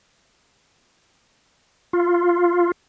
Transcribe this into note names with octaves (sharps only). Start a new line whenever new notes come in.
F4